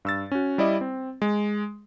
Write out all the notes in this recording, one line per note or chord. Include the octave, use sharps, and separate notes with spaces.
G2 E6 A6
C#4 F#4
G3 E4 D5 D#5
C4
G#3